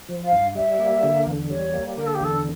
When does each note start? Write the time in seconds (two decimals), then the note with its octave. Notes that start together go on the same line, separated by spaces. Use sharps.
0.09 F3
0.25 F5
0.32 G2
0.55 G3 E5
0.79 A#3
1.03 D3
1.26 E2
1.50 G3 C#5
1.74 A#3
1.97 D3 A#4
2.06 A4
2.14 G4
2.20 E2 A4